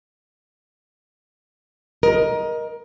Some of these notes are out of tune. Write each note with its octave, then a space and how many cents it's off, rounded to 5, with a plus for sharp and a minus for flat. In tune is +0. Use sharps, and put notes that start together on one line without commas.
A#4 +20 D#5 +0